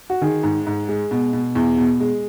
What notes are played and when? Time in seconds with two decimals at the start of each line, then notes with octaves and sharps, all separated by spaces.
0.10 F#4
0.22 D#3 G#4
0.43 G#2
0.67 G#2
0.88 G#3
1.11 B2
1.33 B2
1.55 E2
1.78 B2
2.00 G#3